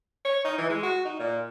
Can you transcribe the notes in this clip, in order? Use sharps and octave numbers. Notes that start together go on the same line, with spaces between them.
C#5
D#4
E3
G#3
F#4
D#4
A#2